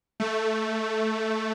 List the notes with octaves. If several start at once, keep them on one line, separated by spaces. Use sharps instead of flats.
A3